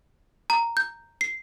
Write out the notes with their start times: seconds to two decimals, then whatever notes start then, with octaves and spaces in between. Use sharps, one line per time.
0.50 A#5
0.77 G6
1.21 C7